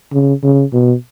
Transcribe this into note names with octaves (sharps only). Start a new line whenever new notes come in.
C#3
C#3
B2